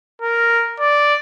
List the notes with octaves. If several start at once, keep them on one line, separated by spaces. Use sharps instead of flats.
A#4
D5